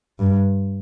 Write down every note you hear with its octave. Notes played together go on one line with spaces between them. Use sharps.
G2